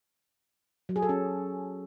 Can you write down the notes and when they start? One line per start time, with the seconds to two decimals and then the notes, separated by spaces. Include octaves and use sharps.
0.89 F#3
0.96 G#4
1.02 A4
1.09 C#4